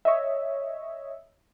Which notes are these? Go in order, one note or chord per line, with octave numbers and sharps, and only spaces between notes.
C#5 D#5 E5